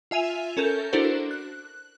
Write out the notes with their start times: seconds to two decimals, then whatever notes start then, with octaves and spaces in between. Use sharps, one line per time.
0.11 F4 E5 G#5 D#7 F7
0.57 C#4 A4 A#4 G6
0.93 D4 E4 F#4 A4 A#4 C5
1.31 F#6